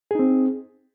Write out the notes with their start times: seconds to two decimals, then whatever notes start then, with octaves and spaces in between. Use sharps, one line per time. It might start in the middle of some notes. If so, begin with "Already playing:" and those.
0.11 G#4
0.15 D#4
0.19 C4